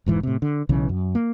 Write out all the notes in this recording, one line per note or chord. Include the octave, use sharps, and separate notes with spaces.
E1 G#2 E3
A2 C3
D3
B1 C#3 E3
F#2
A#3